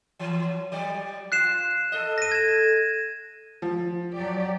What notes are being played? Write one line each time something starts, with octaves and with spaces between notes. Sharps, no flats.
E3 F#3
F#3 G3 D5
F4 F#6 C7 E7
A4 D#5
A#6 D#7
G#6 E7
F3
F#3 G4 D5